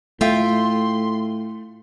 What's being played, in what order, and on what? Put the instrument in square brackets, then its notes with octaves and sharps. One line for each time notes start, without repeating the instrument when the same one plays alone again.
[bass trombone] A2 [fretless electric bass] A3 [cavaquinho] F4 E5 G5 [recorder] C6